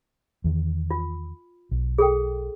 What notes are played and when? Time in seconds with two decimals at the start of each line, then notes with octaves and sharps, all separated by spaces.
0.44 E2 D#3
0.91 F4
1.71 B1
1.98 G#4 A4 G5